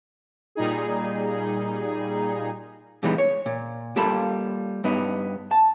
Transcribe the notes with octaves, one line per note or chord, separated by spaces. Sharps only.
A#2 G3 D#4 G#4
A#2 E3 G3 G#3 B3 D#4
C#5
A#2
G3 A#3 F4 A4 A5 B5
G2 B3 D#4
A5